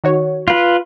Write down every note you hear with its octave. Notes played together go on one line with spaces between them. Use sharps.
D#3 F#4 C#5
F4 B4